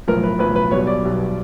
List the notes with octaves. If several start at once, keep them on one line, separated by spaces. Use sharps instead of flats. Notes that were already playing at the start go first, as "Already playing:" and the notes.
B1 A2 F3 A#4
B4
B1 A2 F3 B4
B4
B1 B2 G3 C#5
D5
B1 B2 G3